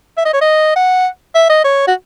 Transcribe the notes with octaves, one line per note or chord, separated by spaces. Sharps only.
E5
D#5
C#5
D#5
F#5
E5
D#5
C#5
F#4